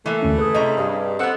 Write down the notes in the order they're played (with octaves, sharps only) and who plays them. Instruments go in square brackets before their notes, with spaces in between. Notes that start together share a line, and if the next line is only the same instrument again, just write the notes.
[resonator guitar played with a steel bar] E3 A#3 [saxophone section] A3 E4
[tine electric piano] D2 C#4
[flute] G#4 [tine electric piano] B4
[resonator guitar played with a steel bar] C3 C#4 A#5 [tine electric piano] D#5
[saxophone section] G2
[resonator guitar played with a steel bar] B3 A4 [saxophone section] C4 F#5